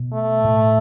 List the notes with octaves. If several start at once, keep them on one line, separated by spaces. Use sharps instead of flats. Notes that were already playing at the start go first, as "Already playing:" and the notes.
Already playing: B2
A3
A2